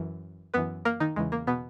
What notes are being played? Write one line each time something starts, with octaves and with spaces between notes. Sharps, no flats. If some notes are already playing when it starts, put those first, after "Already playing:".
Already playing: F#2 E3
F#2 E3 B3 B4
A#3 A#4
D#3 D#4
E2 C#3 E3 G#3
A#3
B2 B3